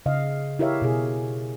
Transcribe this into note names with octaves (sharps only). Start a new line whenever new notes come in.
C#3 D#5 F5
E4 G4 A#4 C#5 E5 F5
B2 G#4